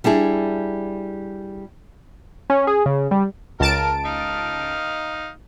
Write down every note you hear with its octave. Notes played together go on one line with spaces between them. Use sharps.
G3 D4 E4 G#4
C#4
G#4
C#3
G3
C#2 A#4 A5 D7
D#4 F5